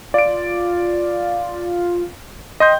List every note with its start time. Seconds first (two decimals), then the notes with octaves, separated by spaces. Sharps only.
0.14 F4 D5 D7
2.60 D#5 G5 C6 G6